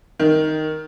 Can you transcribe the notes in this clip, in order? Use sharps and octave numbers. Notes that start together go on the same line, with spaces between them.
D#3